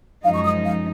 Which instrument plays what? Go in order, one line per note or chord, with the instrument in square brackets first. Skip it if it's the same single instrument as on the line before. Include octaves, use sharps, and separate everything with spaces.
[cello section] F#2 F3 G#3 D#4 [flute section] F5
[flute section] C#6
D#6
F5